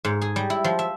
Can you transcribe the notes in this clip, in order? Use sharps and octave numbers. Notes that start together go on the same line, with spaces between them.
G#2
G#4
G3
E4
F3
E5